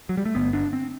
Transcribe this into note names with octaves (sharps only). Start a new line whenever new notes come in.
F#3
G3
A3
G1 G2 D3 B3
D4
C4